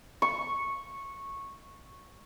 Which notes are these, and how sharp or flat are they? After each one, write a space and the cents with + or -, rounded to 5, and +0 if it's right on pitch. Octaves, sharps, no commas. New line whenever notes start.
C#6 -10